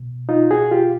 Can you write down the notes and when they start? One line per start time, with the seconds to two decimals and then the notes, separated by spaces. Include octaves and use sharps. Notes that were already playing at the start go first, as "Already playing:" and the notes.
Already playing: B2
0.29 D#4 F4
0.50 F#4 G#4
0.71 F4 G4